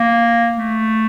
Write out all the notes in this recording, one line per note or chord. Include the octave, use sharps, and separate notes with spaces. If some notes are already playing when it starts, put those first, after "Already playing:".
Already playing: A#3
A3